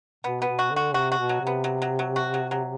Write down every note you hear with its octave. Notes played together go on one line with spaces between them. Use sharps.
B2 B3
B3
B2
F#4
D3
F#4
C3 F#4
F#4
B2
F#3
C3
B3
F#3
F#3
F#3
F#4
F#3
F#3